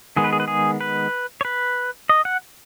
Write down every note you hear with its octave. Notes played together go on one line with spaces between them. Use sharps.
D#3 G#3 B3 G#4
B4
G#4
B4
G#4
B4
C#5
B4
D#5
F#5